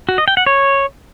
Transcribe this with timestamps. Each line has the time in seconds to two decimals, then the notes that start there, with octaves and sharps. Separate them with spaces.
0.09 F#4
0.18 D#5
0.28 G5
0.37 F#5
0.46 C#5